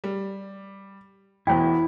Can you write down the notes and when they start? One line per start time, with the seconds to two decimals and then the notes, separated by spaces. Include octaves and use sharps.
0.04 G3
1.47 E1 E2 E4 C5 C#5 G5